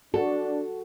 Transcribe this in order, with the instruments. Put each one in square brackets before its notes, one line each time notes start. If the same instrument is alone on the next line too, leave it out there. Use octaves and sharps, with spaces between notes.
[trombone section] D4 [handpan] F#4 [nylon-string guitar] A4